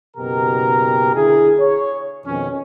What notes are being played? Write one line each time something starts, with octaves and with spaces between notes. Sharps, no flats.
F#1 B2 G4 A#4 A#5
D3 E4 G#4
C#5
F2 B2 D#3 C#4